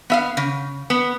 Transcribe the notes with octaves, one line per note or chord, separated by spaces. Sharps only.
B3 E5 F5
C#3
B3